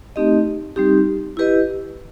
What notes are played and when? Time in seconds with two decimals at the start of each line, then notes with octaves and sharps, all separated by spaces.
0.16 A3 C4 D#4 G4 D#5
0.76 G3 C4 D#4 G4
1.37 E4 G4 B4 D#5